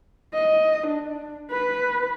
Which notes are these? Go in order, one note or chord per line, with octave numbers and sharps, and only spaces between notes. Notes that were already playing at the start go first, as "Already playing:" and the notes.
D#5
D4
B4